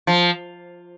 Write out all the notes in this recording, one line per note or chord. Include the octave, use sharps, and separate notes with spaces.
F3